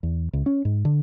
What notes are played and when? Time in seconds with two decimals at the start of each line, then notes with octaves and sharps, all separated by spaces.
0.03 E2
0.33 C#2
0.46 C#4
0.65 G#2
0.85 D3